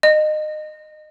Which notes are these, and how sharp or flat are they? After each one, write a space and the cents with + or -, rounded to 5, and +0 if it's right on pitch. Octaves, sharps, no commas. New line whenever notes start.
D#5 -25